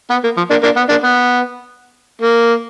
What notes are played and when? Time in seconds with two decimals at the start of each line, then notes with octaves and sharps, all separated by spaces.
0.10 B3
0.24 A#3
0.37 F3
0.50 A#3 D4
0.63 A#3 D4
0.76 B3
0.89 A#3 D4
1.03 B3
2.21 A#3